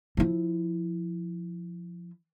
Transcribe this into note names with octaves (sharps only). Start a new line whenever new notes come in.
F3 E4